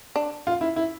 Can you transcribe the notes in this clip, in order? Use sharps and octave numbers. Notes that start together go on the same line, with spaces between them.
D4
F4
E4
E4